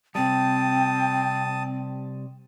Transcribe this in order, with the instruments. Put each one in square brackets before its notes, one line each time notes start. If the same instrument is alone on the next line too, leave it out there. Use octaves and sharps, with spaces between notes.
[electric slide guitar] C3 G3 [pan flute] C4 [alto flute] G5 [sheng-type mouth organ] A5 D#6